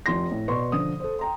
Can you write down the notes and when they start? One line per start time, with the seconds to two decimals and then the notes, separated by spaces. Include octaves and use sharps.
0.06 F1 F4 C6 A#6
0.31 A2
0.48 B2 B4 D5 C6 C#6
0.72 D3 F3 D#6
1.00 A4 C5
1.19 G5 A#5 C6